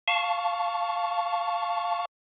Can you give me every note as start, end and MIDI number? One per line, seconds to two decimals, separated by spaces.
0.08 2.05 77
0.08 2.05 81
0.08 2.05 85